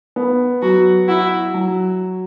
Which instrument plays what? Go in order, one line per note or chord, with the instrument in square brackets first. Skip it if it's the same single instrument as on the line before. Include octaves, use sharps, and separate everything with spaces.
[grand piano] B3
[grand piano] F#3 [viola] F#4
[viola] E4 [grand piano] F#4
[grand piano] F#3